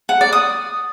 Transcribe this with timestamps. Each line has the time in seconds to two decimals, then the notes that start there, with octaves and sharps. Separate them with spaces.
0.09 F#5
0.21 D5
0.33 D#6